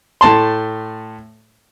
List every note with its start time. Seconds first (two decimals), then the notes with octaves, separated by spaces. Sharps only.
0.21 A2 A3 A5 C6